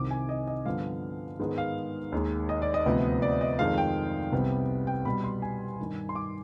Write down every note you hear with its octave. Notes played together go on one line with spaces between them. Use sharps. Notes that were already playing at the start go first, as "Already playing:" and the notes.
Already playing: C2 C3 D#3 D6
G#5
D#5
D#5
G2 D3 F3 B3 F5
G#2 D#3 G#3 B3
F5
D#2 D#3 G#3
D#5
D5
D#5
D2 C3 F3 B3
D5
D#5
F2 D#3 G#3 F5
G5
C2 C3 G3 B3
G5
B2 G3 B3 B5
C6
G#5
G2 D#3 G3
C6
D6